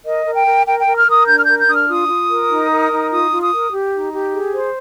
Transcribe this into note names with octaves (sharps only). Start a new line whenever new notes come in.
A#4 D#5
A#4
G5
A#4
A#4 G5
A#4 G5
F6
A#4 D#6
D4 G6
F6
A#4 G6
G6
D4 D#6
F6
F4 D#6
F4
A#4
D#4
A#4
D#4
F4 D#6
F4
D#6
A#4
G4
D#4
G4
G#4
C5